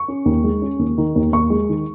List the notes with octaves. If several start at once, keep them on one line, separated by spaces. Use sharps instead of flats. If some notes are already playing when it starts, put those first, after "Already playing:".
Already playing: C#6
C#4
D#2
G#3
C#4
D#2
D#3
D#2
D#2 C#6
G#3
D#3